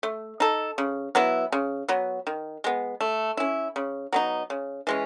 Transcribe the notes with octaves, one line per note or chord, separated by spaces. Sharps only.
A3
D#4 A4
C#3
F#3 B3 E4
C#3
F#3 B3
D#3
G#3 B3
A3
C#4 E4
C#3
F#3 B3 D#4
C#3
E3 G#3 C#4